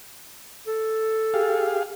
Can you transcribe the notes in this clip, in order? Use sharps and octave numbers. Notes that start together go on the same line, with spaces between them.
A4
G4 G#4 F5